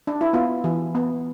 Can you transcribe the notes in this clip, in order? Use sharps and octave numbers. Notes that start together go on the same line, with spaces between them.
D4
E4
B3 F4
E3
B3